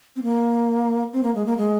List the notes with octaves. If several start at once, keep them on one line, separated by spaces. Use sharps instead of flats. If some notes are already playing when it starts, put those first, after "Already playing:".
C4
A#3
C4
A#3
G#3
A#3
G#3